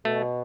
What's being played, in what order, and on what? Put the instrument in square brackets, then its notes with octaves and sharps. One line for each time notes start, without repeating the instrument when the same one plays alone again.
[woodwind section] B2 [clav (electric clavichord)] A3